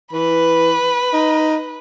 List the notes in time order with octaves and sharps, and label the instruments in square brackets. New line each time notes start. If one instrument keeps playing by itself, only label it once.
[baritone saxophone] E3 [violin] B4
[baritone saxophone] D#4